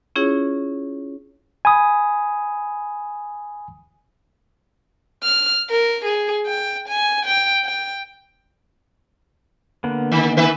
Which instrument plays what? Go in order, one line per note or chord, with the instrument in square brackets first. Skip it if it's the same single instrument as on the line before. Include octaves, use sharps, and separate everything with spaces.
[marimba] C#4 E4 F4 G#4 C#5
[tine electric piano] G#5 B5 D#6
[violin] F6
A#4
G#4
G5
G#5
G5
G5
[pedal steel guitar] D3 A#3 B3
[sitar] D#3
D#3 B4 E5